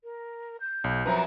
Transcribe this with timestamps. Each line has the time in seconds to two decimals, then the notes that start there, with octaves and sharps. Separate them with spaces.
0.04 A#4
0.61 G6
0.84 B1
1.06 F#2 F3 C4 B4 A#5